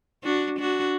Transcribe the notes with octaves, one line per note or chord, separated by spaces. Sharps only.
D4 F#4
D4 F#4